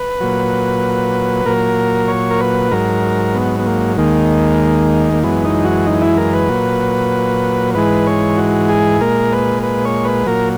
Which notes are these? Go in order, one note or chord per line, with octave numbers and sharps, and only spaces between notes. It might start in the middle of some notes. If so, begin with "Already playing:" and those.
Already playing: B4
A#2 F#3
A#2 F#3 A#4
C#5
A#4
B4
G#2 F#3 A#4
B3
B3
A#3
D#2 D#3 G#3 A#3
A#3
F#2 E3 G#3 B3
D#4
F#4
D#4
E4
A#4
B4
A#2 F#3
G#2 E3 G#3 B4
C#5
F#4
G#4
A#2 G#3 A#4
B4
B4
C#5
B4
A#2 F#3 A#4